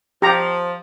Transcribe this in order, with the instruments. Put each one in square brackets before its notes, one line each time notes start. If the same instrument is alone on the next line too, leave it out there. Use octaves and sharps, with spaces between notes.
[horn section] F3 [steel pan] G4 A#5